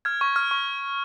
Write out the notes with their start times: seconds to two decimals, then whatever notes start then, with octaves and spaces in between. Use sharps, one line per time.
0.05 F6 G#6
0.21 C#6
0.36 F6
0.51 C#6